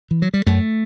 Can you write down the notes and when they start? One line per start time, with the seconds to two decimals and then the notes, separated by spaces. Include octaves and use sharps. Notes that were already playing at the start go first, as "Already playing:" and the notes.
0.11 E3
0.22 F#3
0.34 G3
0.46 F#2 A3